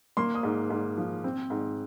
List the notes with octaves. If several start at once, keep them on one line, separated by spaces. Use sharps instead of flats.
A#3 C6
D#6
G#2
G#2
F3
C4
G#2